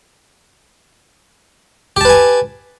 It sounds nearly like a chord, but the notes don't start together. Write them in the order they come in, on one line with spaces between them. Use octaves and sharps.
G4 A5 B4 G#5